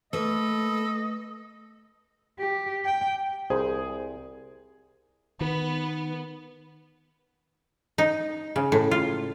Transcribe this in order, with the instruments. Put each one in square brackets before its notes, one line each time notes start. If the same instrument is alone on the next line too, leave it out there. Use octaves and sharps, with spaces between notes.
[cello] A3 [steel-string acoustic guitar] A#3 B4 [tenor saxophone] A4 [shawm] D#5
[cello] G4
G5
[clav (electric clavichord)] C2 [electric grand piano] G#4 [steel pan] C5
[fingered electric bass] D#3 [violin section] B3
[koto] D#4
C#3
A2
F4